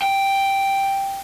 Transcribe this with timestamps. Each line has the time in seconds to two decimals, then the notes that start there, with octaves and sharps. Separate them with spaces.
0.02 G5